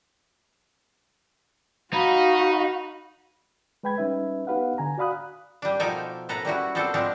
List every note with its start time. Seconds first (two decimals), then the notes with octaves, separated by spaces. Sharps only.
1.93 D#4 F#4 F5 B5
3.83 G#3 B4 G5 B5 G#6
3.98 G3 C#4 D#4 B4 E5
4.47 B3 D#4 G4 B4 F5 F#5
4.78 D3 G#5 A#5
4.98 F#4 D5 F5 B5 D#6 F#6
5.62 G3 D4
5.80 B2 F3 D#4 A4 G5 G#5
6.29 A2 A4 B4 A#5
6.45 G3 C#4 E4 F#4
6.75 B3 C4 D4 A4 C5
6.94 F3 G#3 B3 C4 D4